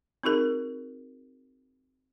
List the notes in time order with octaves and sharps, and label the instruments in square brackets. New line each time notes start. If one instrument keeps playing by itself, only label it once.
[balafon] C4 D#4 F#4 G#4 A#4